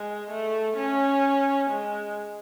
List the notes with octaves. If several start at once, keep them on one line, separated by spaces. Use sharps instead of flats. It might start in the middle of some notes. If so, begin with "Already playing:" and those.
Already playing: G#3
A3
C#4
G#3